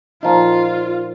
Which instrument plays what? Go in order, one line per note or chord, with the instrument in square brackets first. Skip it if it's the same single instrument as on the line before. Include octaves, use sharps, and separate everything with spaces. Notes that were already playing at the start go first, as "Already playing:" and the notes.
[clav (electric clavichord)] A#2 F3 D#4 [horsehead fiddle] F4